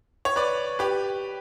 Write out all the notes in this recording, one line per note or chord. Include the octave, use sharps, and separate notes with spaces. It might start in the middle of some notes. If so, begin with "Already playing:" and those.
C#5
B4 D5
G4 B4